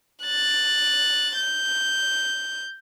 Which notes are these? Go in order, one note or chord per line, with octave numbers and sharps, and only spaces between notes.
F#6 A6
G6